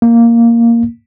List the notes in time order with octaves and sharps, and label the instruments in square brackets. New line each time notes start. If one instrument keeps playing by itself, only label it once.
[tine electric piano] A#3